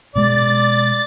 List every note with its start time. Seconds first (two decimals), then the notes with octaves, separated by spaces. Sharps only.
0.16 B2 G#3 D5 A6